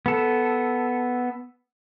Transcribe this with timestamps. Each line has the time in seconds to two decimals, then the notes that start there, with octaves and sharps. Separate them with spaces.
0.06 B3 A4